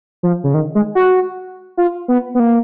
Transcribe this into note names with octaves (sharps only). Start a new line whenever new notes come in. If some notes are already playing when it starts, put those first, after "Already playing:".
F3
C#3
D#3
G#3
F#4
F4
B3
B3
A#3